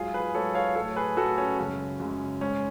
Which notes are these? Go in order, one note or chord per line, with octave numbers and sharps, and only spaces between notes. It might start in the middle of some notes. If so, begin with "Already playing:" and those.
Already playing: G#2 F#3 F4 G#4
G#4 B4
G#2 F#3 A4 C#5
C#5 F5
A2 F#3 A4 C#5
G#4 B4
A2 F#3 F#4 A4
C#4
F#2 C#3 G#3 C#4
F#2 C#3 G#3
G#2 G#3 C#4